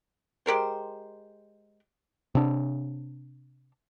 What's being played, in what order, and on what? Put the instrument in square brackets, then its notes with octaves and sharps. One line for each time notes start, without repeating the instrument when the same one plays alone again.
[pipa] G#3 G4 A#4 C5
[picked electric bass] C3 D4